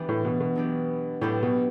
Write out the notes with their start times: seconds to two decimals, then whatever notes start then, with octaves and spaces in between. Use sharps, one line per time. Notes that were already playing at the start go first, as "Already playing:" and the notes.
Already playing: E3 G3 B3 D4 G4
0.09 A2
0.25 B2
0.40 B2
0.55 F#3 B3 D4 G4
1.21 A2 F#3 B3 D4 G4
1.43 B2